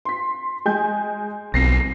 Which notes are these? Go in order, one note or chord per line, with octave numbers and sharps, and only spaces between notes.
C6 B6
G#3 G#5 G6
B1 C4 A#6 C7